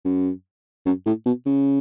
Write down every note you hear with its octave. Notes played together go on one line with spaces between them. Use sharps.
F#2
F#2
A2
B2
C#3